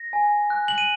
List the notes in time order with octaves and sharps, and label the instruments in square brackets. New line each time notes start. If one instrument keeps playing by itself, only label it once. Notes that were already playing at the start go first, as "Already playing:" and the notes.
Already playing: [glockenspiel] A#6
G#5
F#6
F#7
D#7